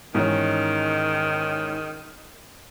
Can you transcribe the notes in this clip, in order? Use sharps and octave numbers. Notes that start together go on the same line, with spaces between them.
G#2 D#3 E3 C#4